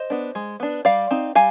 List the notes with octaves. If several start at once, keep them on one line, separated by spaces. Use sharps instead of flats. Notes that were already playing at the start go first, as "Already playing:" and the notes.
Already playing: C5 D#5
B3 D4
G#3
B3 D4
G3 D5 F5
C4 D#4
G3 F5 G#5